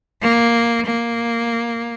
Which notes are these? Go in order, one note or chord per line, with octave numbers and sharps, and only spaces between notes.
A#3
A#3